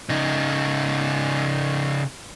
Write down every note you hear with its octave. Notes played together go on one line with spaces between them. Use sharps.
C#3 D#4